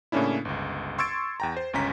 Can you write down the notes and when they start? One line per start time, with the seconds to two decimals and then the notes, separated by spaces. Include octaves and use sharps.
0.12 A2 C#3 A#3 C#4 D4 E4
0.45 G1 C#2
0.98 C6 C#6 E6 G#6 A6 D7
1.40 E2 G5 A#5
1.57 C5
1.73 G1 C#2 C#4 A#5 B6